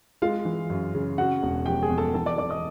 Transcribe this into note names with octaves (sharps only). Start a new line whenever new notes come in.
G#3 F4 F5
E3
F#2
C#3
C#3 F#4 F#5
E1
F3 G4 G5
G#4 G#5
E2
A4 A5
E3 A4 A5
D5 D6
E3 D5 D6
D#5 D#6